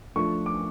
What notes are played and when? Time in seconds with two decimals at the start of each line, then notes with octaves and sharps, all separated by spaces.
0.16 F3 A3 D4 C#6
0.46 D6